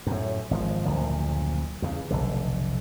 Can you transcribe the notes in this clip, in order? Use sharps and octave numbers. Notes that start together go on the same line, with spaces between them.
F#2 A2
G#1 C#3 F3
F#1 D2 A#2 F3
E2 C#3
F1 B1 D3